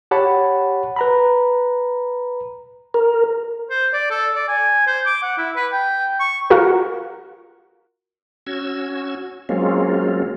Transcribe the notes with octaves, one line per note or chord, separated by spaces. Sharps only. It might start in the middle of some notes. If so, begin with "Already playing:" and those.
G4 C#5 F#5 A5 B5
B4 A#5 B5
A#4
C5
D5
A4
D5
G#5
C5
D6
F#5
E4
B4
G5
C#6
F4 F#4 A#4
C#4 F#4 E6 G#6
F#3 G#3 A#3 C4 C#4 F4